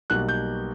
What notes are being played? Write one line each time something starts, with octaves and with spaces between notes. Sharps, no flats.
B1 B2 G3 A#3 F#6
G6